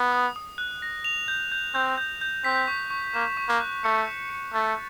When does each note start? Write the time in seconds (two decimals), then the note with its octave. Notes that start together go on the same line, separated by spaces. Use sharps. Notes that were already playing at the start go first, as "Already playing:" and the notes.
Already playing: B3
0.12 D#6
0.36 D#6
0.58 F#6
0.82 A#6
1.04 F7
1.28 G6
1.52 G6
1.74 C4 G6
1.98 G6
2.21 G6
2.44 C4 B6
2.67 C#6
2.90 C#6
3.14 A#3 E7
3.37 C#6
3.49 A#3
3.60 F#6
3.84 A3 C#7
4.08 E7
4.30 C#7
4.53 A3 A6